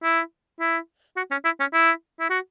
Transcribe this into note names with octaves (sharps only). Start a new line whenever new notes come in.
E4
E4
F#4
C#4
E4
C#4
E4
E4
F#4